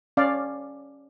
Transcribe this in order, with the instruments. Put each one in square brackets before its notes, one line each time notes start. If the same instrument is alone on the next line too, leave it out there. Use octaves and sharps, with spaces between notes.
[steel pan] C#4 D5 F5